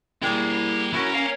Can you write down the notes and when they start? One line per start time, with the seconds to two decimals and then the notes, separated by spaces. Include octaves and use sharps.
0.22 G3 A#3 E4 G#4 G5
0.93 C#4 E4 F#4 A#4
1.14 A#4 F5